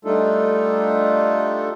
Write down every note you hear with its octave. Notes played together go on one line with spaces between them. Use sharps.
G3 A3 D4 D#4 F4 A4